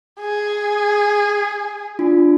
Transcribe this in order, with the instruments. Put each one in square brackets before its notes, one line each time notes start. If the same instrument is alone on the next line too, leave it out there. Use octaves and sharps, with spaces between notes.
[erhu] G#4
[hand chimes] D4 F4